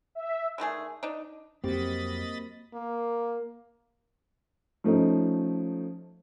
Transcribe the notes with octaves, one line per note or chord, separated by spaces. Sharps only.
E5
D3 D#3 A3 G#4
D4 D#4
F2 F#3 A#3 C4 G4 D#5 B5 A6
A#3
F3 A3 C#4 D#4